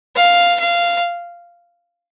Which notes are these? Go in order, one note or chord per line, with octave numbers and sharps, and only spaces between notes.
F5
F5